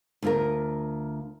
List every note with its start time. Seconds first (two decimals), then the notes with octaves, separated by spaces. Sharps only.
0.23 D2 F4 A#4